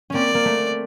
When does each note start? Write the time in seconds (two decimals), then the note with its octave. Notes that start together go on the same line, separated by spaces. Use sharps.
0.10 A#3 C4 C#4 D5
0.34 A#3
0.45 A3